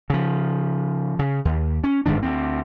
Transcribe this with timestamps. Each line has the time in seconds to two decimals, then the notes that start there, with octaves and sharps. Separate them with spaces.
0.10 C#3 F3
1.19 C#3
1.45 D#2
1.84 C#4
2.06 G1 G#2 D#3 D4
2.22 D2 C4